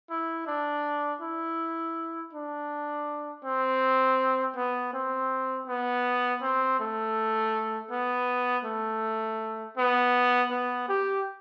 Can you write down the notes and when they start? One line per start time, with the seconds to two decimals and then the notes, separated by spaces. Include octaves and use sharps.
0.10 E4
0.47 D4
1.21 E4
2.33 D4
3.44 C4
4.56 B3
4.93 C4
5.67 B3
6.42 C4
6.80 A3
7.91 B3
8.65 A3
9.77 B3
10.51 B3
10.88 G4